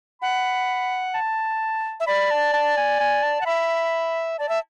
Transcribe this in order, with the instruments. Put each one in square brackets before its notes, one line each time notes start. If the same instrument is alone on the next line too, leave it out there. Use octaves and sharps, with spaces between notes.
[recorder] F#5 [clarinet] B5
[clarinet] A5
[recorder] E5
[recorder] D5 [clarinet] B5
[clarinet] A5
A5
G#5
G#5
A5
[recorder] F#5
[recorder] E5 [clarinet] B5
[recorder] D5 [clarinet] A5
[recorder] E5